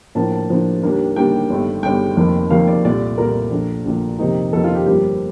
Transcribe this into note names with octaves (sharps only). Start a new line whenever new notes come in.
A2 F3 A#3 D4 A5
A5
A2 F3 A#3 D4
D#2 D#3 G3 A#3 D4
D#2 D#3 G3 A#3 D4 G5
G1 G2 D#3 A3
G1 G2 D#3 A3 G5
F1 F2 D#3 A#3
F1 F2 D#3 A#3 F5
D5
C2 A#2 A3 D5
C2 A#2 A3 A#4
A#1 A#2 A3 D4
A#1 A#2 A3 D4
F2 C3 D#3 A#3 D#4
F2 C3 D#3 A#3 D#4 A4
F4
G4
G1 G2 F3 A#3 G4